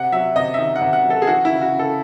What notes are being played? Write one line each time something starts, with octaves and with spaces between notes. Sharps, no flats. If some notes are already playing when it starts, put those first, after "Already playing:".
Already playing: C3 F#5
F#3 E5
C3 D#5
E5
D#3 D#5
F#5
C3
F#5
F#3
A4
G#4
E3 F#4
C#3 E4
F#4
C#3
A4